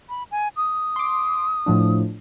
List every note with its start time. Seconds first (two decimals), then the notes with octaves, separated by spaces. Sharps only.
0.09 B5
0.31 G#5
0.57 D#6
0.96 C6 D6
1.66 A2 F3 D4